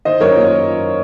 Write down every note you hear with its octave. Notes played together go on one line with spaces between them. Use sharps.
D#3 C5 D#5
F#2 A#4 C#5
A#3 F4